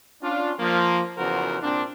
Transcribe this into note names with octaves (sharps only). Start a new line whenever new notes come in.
C#4 D4 F4
F3 A#3
E2 C#3 F3 F#4 A#4 C5
C2 A#2 C4 D4